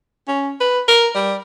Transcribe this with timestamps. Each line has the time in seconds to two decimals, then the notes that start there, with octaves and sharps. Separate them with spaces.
0.28 C#4
0.61 B4
0.88 A#4
1.15 G3